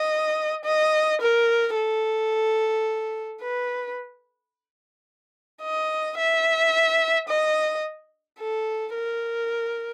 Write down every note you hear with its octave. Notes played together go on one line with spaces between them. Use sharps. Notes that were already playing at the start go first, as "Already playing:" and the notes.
Already playing: D#5
D#5
A#4
A4
B4
D#5
E5
D#5
A4
A#4